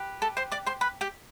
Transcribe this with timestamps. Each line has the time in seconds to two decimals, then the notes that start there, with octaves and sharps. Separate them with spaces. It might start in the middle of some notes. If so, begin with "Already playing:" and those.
Already playing: G4 B4
0.22 A4 A5
0.37 C5 C6
0.52 D5 D6
0.66 C5 C6
0.81 B4 B5
1.01 G4 G5